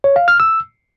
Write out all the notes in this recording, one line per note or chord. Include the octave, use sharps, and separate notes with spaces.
C#5
F5
F6
E6